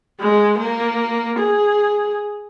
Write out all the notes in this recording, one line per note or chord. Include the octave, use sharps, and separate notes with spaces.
G#3
A#3
G#4